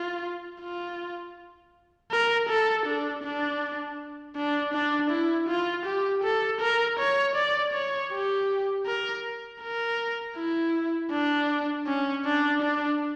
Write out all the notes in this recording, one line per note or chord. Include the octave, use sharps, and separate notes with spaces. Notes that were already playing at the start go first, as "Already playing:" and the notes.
Already playing: F4
F4
A#4
A4
D4
D4
D4
D4
E4
F4
G4
A4
A#4
C#5
D5
C#5
G4
A#4
A#4
E4
D4
C#4
D4
D4